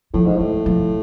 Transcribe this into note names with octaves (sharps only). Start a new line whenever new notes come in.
A2 F3
G#2
A2 G#3
F3